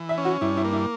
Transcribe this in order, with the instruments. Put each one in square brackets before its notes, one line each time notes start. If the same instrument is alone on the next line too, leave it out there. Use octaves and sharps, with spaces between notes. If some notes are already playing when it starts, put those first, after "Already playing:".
Already playing: [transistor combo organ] E3
[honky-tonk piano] E5
[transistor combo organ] C#4
[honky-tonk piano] F#4
[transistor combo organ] G2 [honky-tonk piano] E4
[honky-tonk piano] E4
[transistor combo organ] A#3
[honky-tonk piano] E4